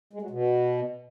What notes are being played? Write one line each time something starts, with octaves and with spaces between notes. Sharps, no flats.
G#3
F#3
B2